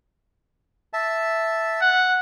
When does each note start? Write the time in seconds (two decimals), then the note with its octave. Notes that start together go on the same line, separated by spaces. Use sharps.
0.93 E5 A5
1.81 F#5